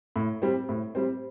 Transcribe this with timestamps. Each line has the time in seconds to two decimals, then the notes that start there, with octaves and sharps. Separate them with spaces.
0.16 A2
0.42 G3 C4
0.69 A2
0.95 G3 C4